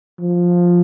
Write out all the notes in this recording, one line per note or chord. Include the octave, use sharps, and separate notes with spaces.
F3